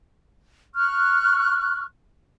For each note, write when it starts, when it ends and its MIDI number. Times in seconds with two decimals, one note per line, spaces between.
0.75 1.84 85
0.75 1.84 89
0.75 1.84 90